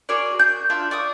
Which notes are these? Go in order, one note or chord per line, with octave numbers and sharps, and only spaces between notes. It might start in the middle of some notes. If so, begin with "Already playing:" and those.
F#4 G#4 A#4 D5
G6
D4 F4 E5 A5
D5 C#6 D#6